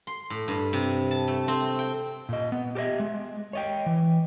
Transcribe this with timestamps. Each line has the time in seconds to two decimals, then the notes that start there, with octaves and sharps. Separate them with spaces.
0.07 C6
0.30 A2
0.48 G2
0.73 C3
1.11 A5
1.28 A3
1.48 C4
1.79 G5
2.29 A#2 D#5
2.52 B3
2.75 G4 A4 B4 D#5 E5
3.00 G#3
3.53 C#5 D#5 G5
3.86 E3